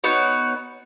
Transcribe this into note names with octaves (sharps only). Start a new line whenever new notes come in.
B3 D#4 F#4 C#5